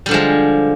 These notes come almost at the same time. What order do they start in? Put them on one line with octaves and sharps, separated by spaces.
G3 D3 F3 G#3